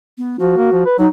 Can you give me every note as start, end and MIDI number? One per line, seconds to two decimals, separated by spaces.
0.18 0.37 59
0.39 0.56 53
0.39 0.83 66
0.57 0.71 58
0.72 0.83 53
0.86 0.95 71
0.99 1.07 54
0.99 1.08 63